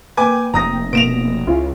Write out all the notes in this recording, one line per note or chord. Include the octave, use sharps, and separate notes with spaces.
A#3 B4 G5 G#5 D6
F1 A#5 D#6 A#6
B2 A#3 A#6 D7 E7 F7
C#2 C#4 E4 F4